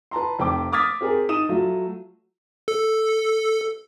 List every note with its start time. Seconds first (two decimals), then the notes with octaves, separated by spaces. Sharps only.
0.11 B4 A5 A#5 C6
0.39 F1 C4 G5 D6
0.72 D6 D#6 F6 G#6 A6 B6
1.01 C4 G4 G#4 A#4
1.29 D#4 D#6 D#7 E7
1.49 F#3 A3 F4
2.68 A4